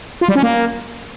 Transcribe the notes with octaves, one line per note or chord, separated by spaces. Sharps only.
F4
G3
C#4
A#3